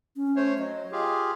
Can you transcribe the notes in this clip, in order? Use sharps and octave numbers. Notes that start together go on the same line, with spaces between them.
C#4
A3 C5 C#5
F#3 D#5
F4 G4 G#4